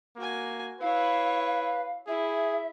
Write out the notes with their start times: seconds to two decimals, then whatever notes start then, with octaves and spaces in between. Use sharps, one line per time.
0.17 A#3 F#4 G#5
0.81 E4 B4 C#5 F5
2.08 E4 G#4 E5